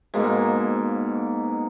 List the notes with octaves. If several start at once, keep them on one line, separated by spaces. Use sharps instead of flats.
G#2 B2 A#3